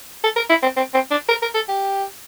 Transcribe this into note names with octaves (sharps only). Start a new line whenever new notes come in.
A4
A#4
E4
C4
C4
C4
D4
A#4
A#4
A4
G4